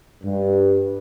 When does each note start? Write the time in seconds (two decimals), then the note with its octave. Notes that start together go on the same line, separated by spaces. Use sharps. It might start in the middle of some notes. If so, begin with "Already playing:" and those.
0.24 G2